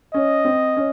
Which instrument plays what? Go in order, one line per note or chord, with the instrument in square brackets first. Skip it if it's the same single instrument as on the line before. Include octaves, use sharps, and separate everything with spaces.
[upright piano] C#4 [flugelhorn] D#5
[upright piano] C4
C#4